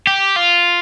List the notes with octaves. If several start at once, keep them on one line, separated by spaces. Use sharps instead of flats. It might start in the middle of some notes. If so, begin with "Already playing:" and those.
G4
F4